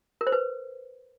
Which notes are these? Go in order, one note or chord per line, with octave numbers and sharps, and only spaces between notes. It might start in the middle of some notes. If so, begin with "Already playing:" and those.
A#4
C5
B4